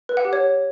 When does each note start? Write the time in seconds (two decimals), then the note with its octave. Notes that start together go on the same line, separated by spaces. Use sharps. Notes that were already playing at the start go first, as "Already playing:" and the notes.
0.09 B4
0.17 F#5
0.25 G4
0.33 C#5